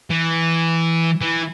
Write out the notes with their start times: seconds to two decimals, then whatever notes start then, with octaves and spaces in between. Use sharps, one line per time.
0.10 E3
1.21 E3